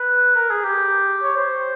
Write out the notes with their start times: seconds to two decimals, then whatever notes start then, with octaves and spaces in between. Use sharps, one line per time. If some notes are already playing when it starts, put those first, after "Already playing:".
Already playing: B4
0.36 A#4
0.50 G#4
0.64 G4
1.22 C#5
1.37 C5